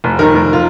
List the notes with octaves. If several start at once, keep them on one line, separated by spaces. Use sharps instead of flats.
F1
D#3 A#4
F1
F4